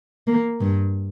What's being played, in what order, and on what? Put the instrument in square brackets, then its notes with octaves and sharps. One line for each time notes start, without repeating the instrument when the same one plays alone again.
[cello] A#3
G2